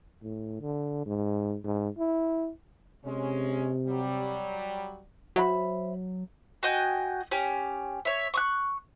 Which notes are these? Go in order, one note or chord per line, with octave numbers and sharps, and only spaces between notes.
A2
D3
G#2
G#2
E4
C3 G#3 C#4
F#3 G3
F#3 C5 E5 B5
F#4 D#5 G5 G#5
C#4 G4
C#5 E5
C#6 D#6 F#6